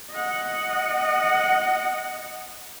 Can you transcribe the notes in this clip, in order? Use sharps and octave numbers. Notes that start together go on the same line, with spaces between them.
D#5 F#5